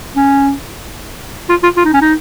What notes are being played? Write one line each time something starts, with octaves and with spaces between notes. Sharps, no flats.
C#4
F4
F4
F4
D#4
C#4
D#4